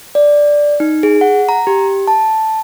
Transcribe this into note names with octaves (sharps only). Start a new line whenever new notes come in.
D5
D#4
G#4
F#5
A#5
G4
A5